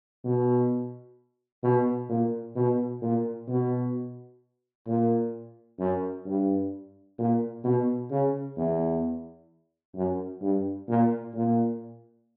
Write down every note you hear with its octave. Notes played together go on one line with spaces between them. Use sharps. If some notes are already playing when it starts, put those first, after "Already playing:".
B2
B2
A#2
B2
A#2
B2
A#2
F#2
G2
A#2
B2
C#3
E2
F#2
G2
A#2
A#2